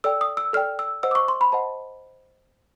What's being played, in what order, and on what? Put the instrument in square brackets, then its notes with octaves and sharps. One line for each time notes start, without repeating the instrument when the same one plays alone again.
[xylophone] A4 D5 G5 E6
D#6
E6
A4 D5 G5 F6
E6
C5 D#5 F#5 E6
D6
C#6
C6
B5
C5 D#5 F#5 A5